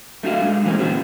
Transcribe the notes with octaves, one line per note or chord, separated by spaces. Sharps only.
A3 D4 F#4 F5
G#3 D4
E3 G#3 A#3 C4 C#4
A#2 D3 B3 C#4 F#4